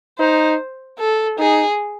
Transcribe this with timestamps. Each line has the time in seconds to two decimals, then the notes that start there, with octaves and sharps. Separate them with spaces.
0.19 D#4 C5
0.99 A4
1.39 D#4 G#4